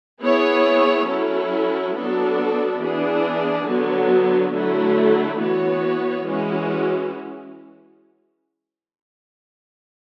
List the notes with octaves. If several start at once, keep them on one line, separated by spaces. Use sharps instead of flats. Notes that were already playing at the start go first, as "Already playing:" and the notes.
B3 E4 G#4 C#5
F#3 C#4 E4 A4
F#3 B3 D4 F#4 A4
E3 B3 D4 G#4
D3 F#3 B3 F#4
D3 F#3 A3 E4
E3 B3 F#4 C#5
E3 G#3 C#4 F#4